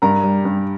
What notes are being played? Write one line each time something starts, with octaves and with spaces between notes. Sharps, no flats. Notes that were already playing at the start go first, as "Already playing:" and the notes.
G2 A#4 A#5
G3
G2